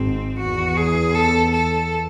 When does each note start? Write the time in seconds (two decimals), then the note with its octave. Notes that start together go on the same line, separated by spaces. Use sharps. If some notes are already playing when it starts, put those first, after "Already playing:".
Already playing: G#1 G#2 C4
0.39 E2 F#4
0.76 G#4
1.15 A4
1.51 A4